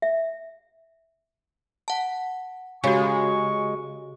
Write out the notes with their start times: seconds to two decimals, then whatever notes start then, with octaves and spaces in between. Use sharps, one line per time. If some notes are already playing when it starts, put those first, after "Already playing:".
0.02 E5
1.88 F#5 A5
2.84 C#3 G#3 F#4 G4 G#5 C#6